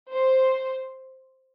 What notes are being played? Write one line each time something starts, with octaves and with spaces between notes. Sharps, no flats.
C5